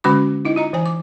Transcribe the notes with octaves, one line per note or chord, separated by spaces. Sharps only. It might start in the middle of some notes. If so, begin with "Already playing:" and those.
D3 G#3 C#4 F#4 B5 D6
D#4 E4 D#5
F4 D#5 A#5
E3 C5 G#5
D6